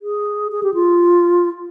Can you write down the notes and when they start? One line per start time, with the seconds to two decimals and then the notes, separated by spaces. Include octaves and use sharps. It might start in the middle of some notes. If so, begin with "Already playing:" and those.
0.02 G#4
0.52 G#4
0.63 G4
0.74 F4